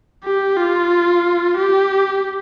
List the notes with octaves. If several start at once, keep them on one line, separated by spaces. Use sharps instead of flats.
G4
F4
G4